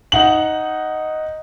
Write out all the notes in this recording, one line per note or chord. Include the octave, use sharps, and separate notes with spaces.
D#4 F#5 F#7